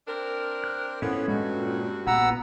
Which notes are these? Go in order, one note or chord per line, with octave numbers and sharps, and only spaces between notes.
C4 D4 A#4
F#6
A2 E3 F3 B3 C#4 A4 C#5
G2 G#3 F#4
A#2
A#1 B3 F#5 A#5 E6